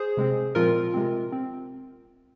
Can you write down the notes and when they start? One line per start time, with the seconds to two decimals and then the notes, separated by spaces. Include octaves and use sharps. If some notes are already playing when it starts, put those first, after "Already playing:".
Already playing: G#4 C5
0.17 C3 G#3 C4
0.55 A#2 F3 G#3 C4 F4 A#4
0.94 C3 G#3 C4
1.32 C4